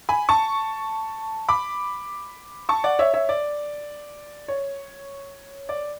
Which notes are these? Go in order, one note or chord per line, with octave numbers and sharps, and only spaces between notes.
G#5 B5
A5 C#6
B5 D6
A5 C#6
D5 F#5
C#5 E5
C#5 E5
D5
C#5
D5